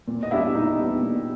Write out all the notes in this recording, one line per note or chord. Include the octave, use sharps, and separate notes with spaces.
A#2
D#5
G3 B3 D4 E4 E5
A#2 D#4 D#5
G3 B3 D4
A#2